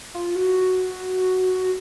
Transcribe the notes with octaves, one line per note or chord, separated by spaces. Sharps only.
F4
F#4